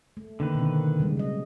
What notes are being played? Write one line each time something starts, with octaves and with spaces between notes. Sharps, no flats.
A3
D3 D#3 A#3 B4
B2 C4
C#3 G3 G#3
F#3 D#5